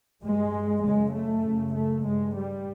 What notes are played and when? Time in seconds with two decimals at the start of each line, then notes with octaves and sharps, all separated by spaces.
0.23 G2 G#3
0.83 F#2 C#3 G#3
1.14 A3
1.44 F#2 C#3
1.74 A3
2.04 G2 G#3
2.35 G3